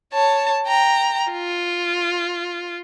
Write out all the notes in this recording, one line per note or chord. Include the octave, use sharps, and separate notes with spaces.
C#5 A5
G5 A#5
F4